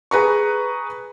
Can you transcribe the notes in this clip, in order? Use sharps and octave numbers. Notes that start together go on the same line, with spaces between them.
G#4 B4 A#5 C#6